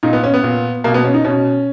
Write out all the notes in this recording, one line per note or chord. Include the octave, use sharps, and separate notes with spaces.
A#2 D#4
B3
C#4
B3
A#2
B2 A#3
B3
C#4
D#4
B2 C#4